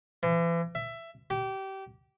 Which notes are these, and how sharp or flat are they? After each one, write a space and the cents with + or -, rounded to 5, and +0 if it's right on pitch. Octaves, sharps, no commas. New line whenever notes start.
E3 +40
E5 +15
G4 -25